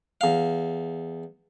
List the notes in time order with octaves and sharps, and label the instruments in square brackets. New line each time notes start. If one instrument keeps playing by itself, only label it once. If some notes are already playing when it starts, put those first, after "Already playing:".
[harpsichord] E2 F5